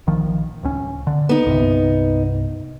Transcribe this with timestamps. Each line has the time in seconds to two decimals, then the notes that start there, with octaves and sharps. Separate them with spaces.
0.07 A#1 D#3 F3
0.63 D1 C#2 C#4
1.07 D3
1.29 B3 D#4
1.46 C2 G2 C3